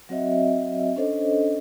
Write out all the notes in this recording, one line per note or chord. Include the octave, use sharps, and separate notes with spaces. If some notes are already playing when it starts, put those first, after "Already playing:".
F#3 C4 F#4 C#5 D#5 E5
C#4 D4 A4 C5 C#5 D#5